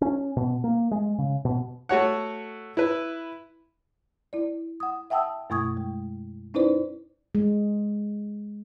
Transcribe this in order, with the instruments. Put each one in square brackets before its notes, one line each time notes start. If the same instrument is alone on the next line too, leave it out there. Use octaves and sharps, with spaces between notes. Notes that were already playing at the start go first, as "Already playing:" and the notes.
[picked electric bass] C#4
B2
A#3
G#3
C#3
B2
[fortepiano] A3 F#4 C#5 F#5
E4 B4
[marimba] E4 D5
F#5 D#6
E5 F#5 G5 A5 D#6 E6
F#2 B2 A3 C#6 D#6 G#6
G#3
C#4 D#4 E4 B4 C5 D5
[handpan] G#3